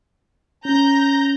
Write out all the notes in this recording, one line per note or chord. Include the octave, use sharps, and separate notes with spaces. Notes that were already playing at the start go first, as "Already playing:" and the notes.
C#4 A#5 G6 A#6